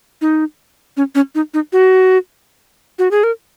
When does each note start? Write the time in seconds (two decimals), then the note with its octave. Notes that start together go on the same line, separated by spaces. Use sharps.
0.21 D#4
0.97 C#4
1.15 C#4
1.35 D#4
1.54 D#4
1.73 F#4
2.99 F#4
3.11 G#4
3.24 A#4